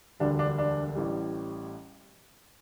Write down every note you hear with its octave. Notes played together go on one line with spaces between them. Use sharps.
E1 D2 D3 G3 D4
D4
D4
A1 A2 G3